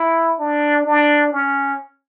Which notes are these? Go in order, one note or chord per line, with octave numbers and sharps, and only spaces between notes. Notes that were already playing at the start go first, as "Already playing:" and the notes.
Already playing: E4
D4
D4
C#4